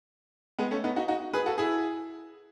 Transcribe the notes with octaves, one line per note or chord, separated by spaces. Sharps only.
G#3 B3
A3 C#4
B3 D#4
D#4 F#4
D#4 F#4
G#4 B4
F#4 A4
E4 G#4